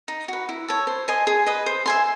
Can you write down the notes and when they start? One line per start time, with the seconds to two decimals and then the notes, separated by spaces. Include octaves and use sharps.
0.08 D#4
0.28 F#4 B4
0.49 E4
0.68 A4 C#5
0.87 C5
1.08 D#5 G#5 C6
1.27 G#4
1.46 B4 D#5
1.66 C5
1.86 E5 G#5 C6